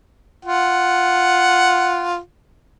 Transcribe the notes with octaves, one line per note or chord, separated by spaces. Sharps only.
F4 F#5